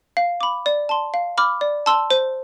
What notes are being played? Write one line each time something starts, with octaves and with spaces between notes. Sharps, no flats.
F5
B5 D6
D5
A5 C6
F5
B5 D6 F6
D5
A5 C6 E6
C5